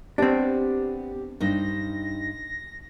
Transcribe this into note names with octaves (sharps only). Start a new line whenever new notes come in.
B3 C4 D4 G4
G2 D#4 C5 A#6